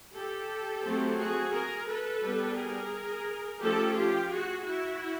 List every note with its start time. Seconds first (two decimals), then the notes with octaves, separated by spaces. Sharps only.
0.14 G4 A4
0.83 F#3 A3 C4
1.18 F#4 G#4
1.52 G#4 A#4
1.86 A4 B4
2.22 G3 B3 D4
2.56 G#4 A#4
3.59 F3 A3 C#4 G4 A4
3.94 F4 G4
4.29 F#4 G#4
4.63 E4 F#4